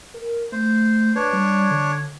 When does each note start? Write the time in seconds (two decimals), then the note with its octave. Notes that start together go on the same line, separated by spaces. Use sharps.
0.14 A#4
0.52 A3 C5
1.16 D4 B4 C#5
1.33 G3
1.71 D3